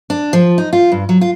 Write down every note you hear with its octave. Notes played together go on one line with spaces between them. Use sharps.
D4
F3
D#4
F4
G2
F#3
F4